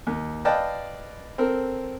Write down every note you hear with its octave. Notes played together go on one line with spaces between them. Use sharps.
D#2
B4 D5 D#5 F5 G5 A5
C4 A4 A#4